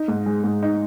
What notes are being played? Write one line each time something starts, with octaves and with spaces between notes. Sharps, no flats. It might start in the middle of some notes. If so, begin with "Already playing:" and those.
Already playing: D#4
G#2
G#3
G#2
D#4